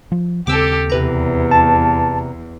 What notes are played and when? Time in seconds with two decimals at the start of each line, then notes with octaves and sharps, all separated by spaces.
0.12 F3
0.47 D#2 C#3 C4 G4 A4 D6 E6
0.90 E2 C3 B4 A#5
1.51 A5